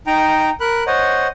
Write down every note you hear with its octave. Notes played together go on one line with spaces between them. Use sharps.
D#4 G5 A#5
A#4 B5 F#6
C5 C#5 D#5 F#5